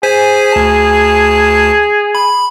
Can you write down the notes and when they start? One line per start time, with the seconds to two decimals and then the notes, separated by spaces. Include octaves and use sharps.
0.03 G#4 C5 G#5 B6
0.52 D2 A5
2.15 B5